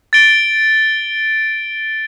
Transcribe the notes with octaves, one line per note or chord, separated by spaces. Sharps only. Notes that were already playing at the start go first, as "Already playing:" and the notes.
A6 D7 G7